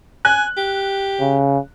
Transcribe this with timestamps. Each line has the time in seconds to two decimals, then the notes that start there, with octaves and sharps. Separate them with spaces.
0.25 G#5 F#6
0.57 G4
1.20 C#3